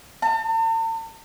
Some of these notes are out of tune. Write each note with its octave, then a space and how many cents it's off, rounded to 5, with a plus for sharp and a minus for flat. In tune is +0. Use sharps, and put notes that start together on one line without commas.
A5 +45